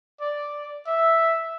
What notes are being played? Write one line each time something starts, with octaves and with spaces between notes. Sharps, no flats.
D5
E5